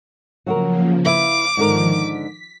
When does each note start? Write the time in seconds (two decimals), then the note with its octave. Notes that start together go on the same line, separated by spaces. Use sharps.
0.46 C#3 F3 F#3 A#3 F#4 A#4
1.05 E4 B4 E5 F5 D6
1.57 G#2 D3 D#3 F3 A#4
1.88 B6